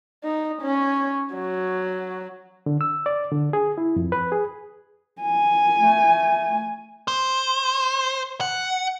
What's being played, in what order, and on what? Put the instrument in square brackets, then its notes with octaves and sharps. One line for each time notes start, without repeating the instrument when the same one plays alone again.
[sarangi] D#4
C#4
F#3
[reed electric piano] D3
E6
D5
D3
G#4
E4
F2
B4
G#4
[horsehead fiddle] G#5
[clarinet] A3
[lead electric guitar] C5
F#5